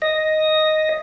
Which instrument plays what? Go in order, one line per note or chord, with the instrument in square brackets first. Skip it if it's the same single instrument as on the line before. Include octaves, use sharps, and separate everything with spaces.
[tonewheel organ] D#5 A#6